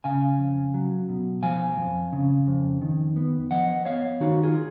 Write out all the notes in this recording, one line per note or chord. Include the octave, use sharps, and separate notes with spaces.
C#3 F5 G#5
F2
F#3
B2
F3 F5 G#5
F2
C#3
F2
D#3
B3
F3 D#5 F#5
B3 C#5 F5
D#3 D#4 F#4
F4 G#4